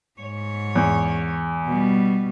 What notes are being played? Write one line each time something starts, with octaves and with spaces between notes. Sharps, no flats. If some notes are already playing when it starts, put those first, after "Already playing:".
G#2 C#5
E2
B2 G3